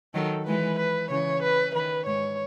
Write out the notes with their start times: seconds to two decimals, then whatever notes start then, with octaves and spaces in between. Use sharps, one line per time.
0.14 D#3 F#3 A4
0.47 E3 G#3 B4
0.79 B4
1.10 C#3 E3 C#5
1.43 B4
1.75 D#3 B4
2.06 G#2 C#5